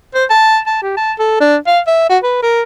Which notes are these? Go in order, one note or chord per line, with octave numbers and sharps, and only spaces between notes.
C5
A5
A5
G4
A5
A4
D4
F5
E5
F#4
B4
A#4